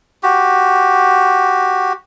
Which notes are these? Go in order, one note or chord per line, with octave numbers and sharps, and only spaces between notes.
F#4 G4